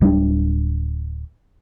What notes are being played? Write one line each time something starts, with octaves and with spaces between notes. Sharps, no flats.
D1 G3 A#3 D4